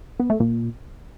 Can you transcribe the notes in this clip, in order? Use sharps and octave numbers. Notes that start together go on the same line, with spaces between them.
B3
A3
A#2